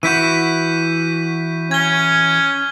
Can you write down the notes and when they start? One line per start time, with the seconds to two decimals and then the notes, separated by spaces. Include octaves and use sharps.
0.03 E3 E4 F#4 G6 B6 D#7
1.71 C#4 G#6 G7